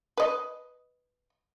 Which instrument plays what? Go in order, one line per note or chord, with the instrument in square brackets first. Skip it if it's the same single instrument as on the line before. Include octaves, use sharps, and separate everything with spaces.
[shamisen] B4 D#5